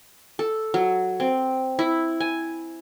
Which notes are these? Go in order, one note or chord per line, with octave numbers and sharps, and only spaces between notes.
A4
F#3
C4
E4
G#5